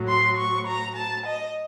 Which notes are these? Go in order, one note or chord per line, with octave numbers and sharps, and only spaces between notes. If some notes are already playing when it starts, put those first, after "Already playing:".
Already playing: A2 F#3
C6
C#6
A#5
A5
D#5